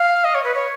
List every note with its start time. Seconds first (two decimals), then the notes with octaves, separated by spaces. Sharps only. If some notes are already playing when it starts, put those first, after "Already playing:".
Already playing: F5
0.25 D#5
0.35 C#5
0.44 B4
0.54 C#5